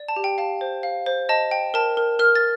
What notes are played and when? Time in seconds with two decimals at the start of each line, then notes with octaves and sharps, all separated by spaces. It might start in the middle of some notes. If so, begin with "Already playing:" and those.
Already playing: D5
0.08 A5
0.16 G4
0.24 G5
0.38 F5 A5
0.61 C5
0.83 F5
1.06 C5
1.29 D#5 A5
1.51 G5
1.74 A#4 A5
1.97 A#4
2.19 A#4 F6
2.35 A6